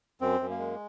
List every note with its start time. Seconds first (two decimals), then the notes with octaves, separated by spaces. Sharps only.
0.21 F#2 C4
0.40 F#2
0.50 A#3
0.59 G#3